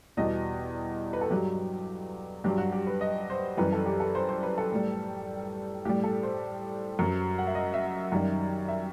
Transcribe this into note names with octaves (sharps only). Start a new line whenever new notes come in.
E2 B2 G3 D#5
B4
A4
G2 F#3 G4
G2 F#3 G4
F#4
G4
B4
D#5
C5
F#2 E3 G3 B4
A4
G4
A4
C5
C5
B4
A4
A2 G3
A2 G3 G4
A4
C5
F#2 F#3
F#5
E5
D#5
E5
F#2 D#3 G3
E5